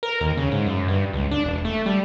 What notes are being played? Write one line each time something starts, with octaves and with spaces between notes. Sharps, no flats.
A#4
D#2
C#3
G#2
F#2
G2
C#2
D4
E1
A3
G3